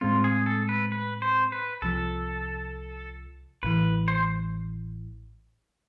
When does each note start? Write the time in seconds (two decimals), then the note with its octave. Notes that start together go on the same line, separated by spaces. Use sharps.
0.01 A2 G#3 C4 F4
0.24 G#4
0.46 A4
0.69 B4
0.92 B4
1.22 C5
1.52 B4
1.82 C2 C3 F3 A4
3.63 A1 A2 E3 B4
4.08 C5